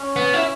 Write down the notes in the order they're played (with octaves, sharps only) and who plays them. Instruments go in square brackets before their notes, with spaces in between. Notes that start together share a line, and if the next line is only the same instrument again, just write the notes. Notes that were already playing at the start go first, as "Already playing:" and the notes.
Already playing: [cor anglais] C#4
[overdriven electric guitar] B3
E4